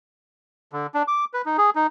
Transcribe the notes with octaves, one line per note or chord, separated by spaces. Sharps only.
D3
D4
D6
B4
D#4
G#4
D#4